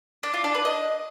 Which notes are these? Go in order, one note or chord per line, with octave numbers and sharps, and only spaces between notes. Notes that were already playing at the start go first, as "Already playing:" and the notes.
D4
F4
D4
B4
D#5